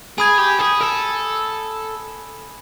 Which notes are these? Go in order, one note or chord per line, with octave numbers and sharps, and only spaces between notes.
G#4 G#5 B5 D#6 G#6
G4
G#4
A4